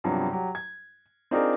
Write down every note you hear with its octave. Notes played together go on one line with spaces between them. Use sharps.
G2 C3 F3 F#3 B3 G4
F#3 G4
G#6
C4 D4 D#4 F4 G#4 A#4